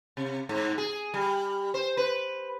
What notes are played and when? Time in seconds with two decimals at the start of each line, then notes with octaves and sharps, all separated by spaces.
0.17 C3
0.49 G#2
0.78 G#4
1.14 G3
1.74 C5
1.97 B4